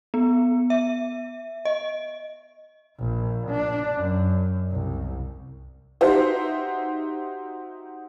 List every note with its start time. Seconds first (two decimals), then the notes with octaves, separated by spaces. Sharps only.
0.14 B3
0.70 E5
1.65 D#5
2.99 A#1
3.50 D4
3.96 F#2
4.71 C2
6.01 D#4 F#4 G4 C5 E5